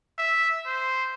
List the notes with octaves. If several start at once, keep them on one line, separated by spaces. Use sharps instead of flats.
E5
C5